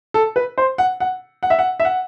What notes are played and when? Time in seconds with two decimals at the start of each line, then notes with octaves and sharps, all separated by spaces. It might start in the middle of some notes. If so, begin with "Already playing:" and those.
0.14 A4
0.36 B4
0.58 C5
0.78 F#5
1.00 F#5
1.43 F#5
1.50 E5
1.59 F#5
1.80 E5
1.85 F#5